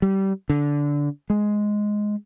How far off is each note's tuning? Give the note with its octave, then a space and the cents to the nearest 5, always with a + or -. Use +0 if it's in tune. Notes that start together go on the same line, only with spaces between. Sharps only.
G3 -20
D3 -15
G#3 +5